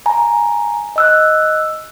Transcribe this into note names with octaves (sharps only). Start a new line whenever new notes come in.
G#5 A#5
D#5 E6 F#6